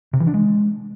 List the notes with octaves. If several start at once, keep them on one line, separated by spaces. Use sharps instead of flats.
C3
E3
D4
G#3